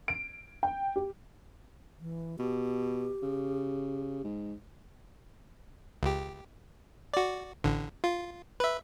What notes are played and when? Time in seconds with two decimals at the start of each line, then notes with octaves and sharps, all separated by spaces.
0.08 D7
0.63 G5
0.96 G4
2.00 E3
2.39 B2 G4
3.23 C#3
4.24 G#2
6.03 C#2 G4
7.14 F#4 D5
7.64 A1 D3
8.04 F4
8.60 B4 E5